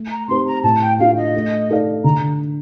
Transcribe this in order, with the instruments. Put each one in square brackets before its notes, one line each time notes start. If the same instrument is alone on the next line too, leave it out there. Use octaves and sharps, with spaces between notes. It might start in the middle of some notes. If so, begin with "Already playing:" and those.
Already playing: [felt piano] A3
[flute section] A#5
[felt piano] C4 D#4 G4 C5 [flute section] C6
[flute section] A#5
[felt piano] A2 [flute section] A5
[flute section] G5
[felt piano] A3 D4 F4 [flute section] F5
[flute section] D#5
[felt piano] A3
D#4 A4 D5 F5
[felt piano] D3 [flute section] A#5